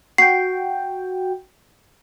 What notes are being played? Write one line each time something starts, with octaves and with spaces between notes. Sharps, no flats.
F#4 G5 C7